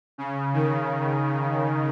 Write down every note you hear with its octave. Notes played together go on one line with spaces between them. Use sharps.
C#3
D#3